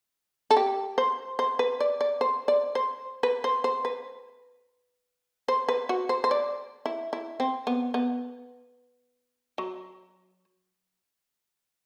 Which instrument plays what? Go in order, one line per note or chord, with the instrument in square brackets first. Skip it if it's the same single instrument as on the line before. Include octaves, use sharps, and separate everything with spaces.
[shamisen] A4
G4
C5
C5
B4
D5
D5
C5
D5
C5
B4
C5
C5
B4
C5
B4
F#4
C5
C5
D5
E4
E4
C4
B3
B3
F#3